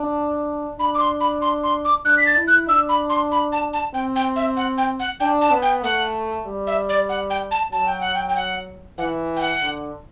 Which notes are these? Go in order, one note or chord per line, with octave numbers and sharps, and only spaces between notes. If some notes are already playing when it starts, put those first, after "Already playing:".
Already playing: D4
D4 B5
D6
C6
B5
C6
C6
D6
D4 F#6
B6
A6
E4
F#6
D4 E6
B5
C6
B5
A5
A5
C4 G5
G5
E5
F#5
G5
F#5
D4 G5
A5
B3
G5
A3 F#5
G3
E5
D5
F#5
G5
A5
F#3 A5
G5
F#5
G5
G5
F#5
E3 F#5
G5
F#5
D3